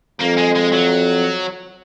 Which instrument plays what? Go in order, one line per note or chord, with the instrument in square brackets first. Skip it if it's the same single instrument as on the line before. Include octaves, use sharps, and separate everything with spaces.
[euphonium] F2 [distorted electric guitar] A#3
[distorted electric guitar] G#3
G#3
F#3